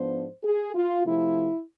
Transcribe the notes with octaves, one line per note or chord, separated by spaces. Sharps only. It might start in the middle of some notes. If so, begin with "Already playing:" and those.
Already playing: G#2 F3 B3 D4 C5
G#4
F4
C3 F3 A3 C4 E4